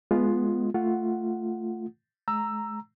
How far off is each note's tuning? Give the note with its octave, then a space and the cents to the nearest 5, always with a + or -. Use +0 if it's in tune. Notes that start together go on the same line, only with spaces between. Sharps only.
G#3 +15 B3 +0 F4 +0
A3 +10 F4 -5 F#5 +0
G#3 +40 A#5 -5 E6 +10